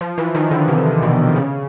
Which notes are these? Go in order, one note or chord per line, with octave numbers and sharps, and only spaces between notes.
F3
E3
D#3
D3
C3
B2
C#3